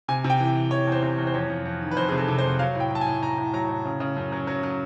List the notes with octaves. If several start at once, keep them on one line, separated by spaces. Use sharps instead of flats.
C3 G#5
C3
G5
E3
E3
E3 C#5
E2 C5
C3
E2
C5
F2 C#5
F2
F2
D#3
B4
F2 C5
C3 G#4
A4
C3
C5
F2
F#3 F5
A2
G5
F#3 A5
G#5
A2
A2 A#5
A2
F#3 A#5
A2
C#3
C#3
F#2
F#3
F#3
F#3